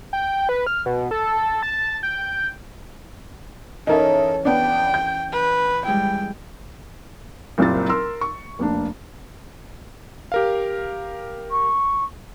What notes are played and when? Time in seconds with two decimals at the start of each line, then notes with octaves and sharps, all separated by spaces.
0.13 G5
0.49 B4
0.67 F6
0.86 B2
1.11 A4
1.63 A5
2.03 G5
3.87 E3 C#4 D#4 A4 A#4 E5
4.45 B3 D4 G5
4.94 G6
5.32 B4
5.85 G3 G#3 E4 G5
7.58 F#1 C2 A#2 A#3 C4 A6
7.89 A#4 C6 E6
8.21 C#6
8.59 F1 A#3 D4
10.32 G4 A#4 F5
11.51 C#6